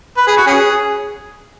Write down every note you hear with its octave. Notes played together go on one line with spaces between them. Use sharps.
B4
G#4
F#4
C#4 G#4